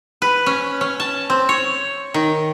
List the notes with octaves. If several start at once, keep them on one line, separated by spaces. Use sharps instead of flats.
B4
C#4
C#4
A5
C4
C#5
D#3